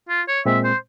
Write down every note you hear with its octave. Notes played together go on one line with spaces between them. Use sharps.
F4
C#5
A#2 G#3 C4 E5
C5